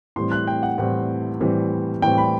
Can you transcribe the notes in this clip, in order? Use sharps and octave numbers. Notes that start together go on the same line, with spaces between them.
A2 E3 G3 C4 C6
F#6
G5
F#5
A2 E3 G3 C4 F#5
A2 E3 G3 C4
A2 E3 G3 C4 G5
B5